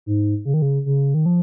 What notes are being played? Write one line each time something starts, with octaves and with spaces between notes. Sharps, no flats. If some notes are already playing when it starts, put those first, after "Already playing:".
G#2
C#3
D#3
C#3
C#3
D#3
F3